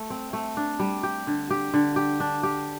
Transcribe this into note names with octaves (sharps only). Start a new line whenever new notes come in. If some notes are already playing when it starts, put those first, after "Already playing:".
Already playing: A3
C4
A3
D4
G3
G4
D3
G4
D3
G4
D4
G4